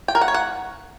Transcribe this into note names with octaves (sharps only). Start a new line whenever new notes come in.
G5
A#4
F#5
C#5
F#5